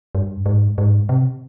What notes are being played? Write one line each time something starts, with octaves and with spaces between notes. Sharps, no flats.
G2
G#2
G#2
C3